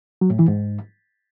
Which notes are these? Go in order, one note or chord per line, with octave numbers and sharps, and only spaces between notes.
F#3
A2
E3
G#2